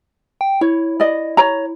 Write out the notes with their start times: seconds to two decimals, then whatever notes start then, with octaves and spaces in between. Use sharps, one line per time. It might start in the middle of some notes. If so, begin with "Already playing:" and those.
0.41 G5
0.61 E4 C#5
1.00 D5 D#5
1.37 C#5 A#5